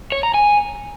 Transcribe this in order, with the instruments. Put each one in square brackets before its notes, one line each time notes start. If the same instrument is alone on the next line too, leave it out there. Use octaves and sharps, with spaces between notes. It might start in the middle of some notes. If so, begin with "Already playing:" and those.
[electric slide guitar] C#5
A#5
G#5